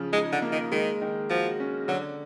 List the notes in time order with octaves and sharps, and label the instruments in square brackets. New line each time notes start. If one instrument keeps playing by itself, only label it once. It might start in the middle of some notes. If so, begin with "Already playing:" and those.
Already playing: [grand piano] C#3 F3
[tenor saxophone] G#3 [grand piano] D#4
[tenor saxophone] D3
[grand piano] A#3
[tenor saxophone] D#3
[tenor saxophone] D#3 [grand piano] G#3
[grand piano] D#3
[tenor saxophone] F3 [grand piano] F#4
[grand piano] C#4
[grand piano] D3 [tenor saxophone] F#3